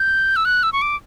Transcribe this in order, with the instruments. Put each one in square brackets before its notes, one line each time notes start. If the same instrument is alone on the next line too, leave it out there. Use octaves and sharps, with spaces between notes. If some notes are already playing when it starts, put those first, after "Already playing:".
Already playing: [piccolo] G6
E6
F#6
E6
C#6
D6